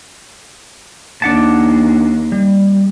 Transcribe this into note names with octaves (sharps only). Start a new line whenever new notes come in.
D#2 D4 F#5 A5
G3